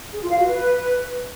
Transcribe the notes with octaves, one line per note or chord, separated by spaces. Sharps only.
G#4
F4
F5
F#4
B4